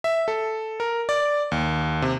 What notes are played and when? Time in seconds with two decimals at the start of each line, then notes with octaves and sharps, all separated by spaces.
0.04 E5
0.28 A4
0.80 A#4
1.09 D5
1.52 D#2
2.02 C3